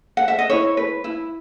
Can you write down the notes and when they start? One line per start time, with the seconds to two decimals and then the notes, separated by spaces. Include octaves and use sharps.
0.17 F#5
0.28 E5
0.39 D#5
0.50 E4 C#5
0.77 B4
1.04 E4